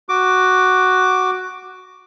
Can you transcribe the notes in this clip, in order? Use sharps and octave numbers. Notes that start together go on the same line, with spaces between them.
F#4 D6